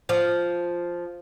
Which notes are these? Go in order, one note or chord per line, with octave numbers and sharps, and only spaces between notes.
F3 C5